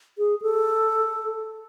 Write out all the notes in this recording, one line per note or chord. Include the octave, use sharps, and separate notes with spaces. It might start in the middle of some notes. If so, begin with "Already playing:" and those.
G#4
A4